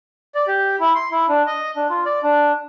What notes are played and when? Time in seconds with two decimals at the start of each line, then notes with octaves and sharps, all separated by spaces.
0.35 D5
0.47 G4
0.80 E4
0.95 C6
1.11 E4
1.28 D4
1.47 D#5
1.76 D4
1.90 F4
2.05 D5
2.23 D4